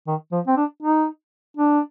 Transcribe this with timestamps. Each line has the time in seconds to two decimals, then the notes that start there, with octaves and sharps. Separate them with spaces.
0.07 D#3
0.32 F3
0.47 C4
0.57 D4
0.83 D#4
1.57 D4